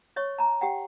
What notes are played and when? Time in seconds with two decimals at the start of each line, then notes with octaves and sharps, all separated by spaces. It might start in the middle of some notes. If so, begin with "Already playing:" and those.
0.16 C#5 D#5 C#6
0.38 A5 A#5
0.61 G4 F#5 G5